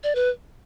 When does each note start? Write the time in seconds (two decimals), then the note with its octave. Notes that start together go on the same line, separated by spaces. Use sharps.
0.04 D5
0.15 B4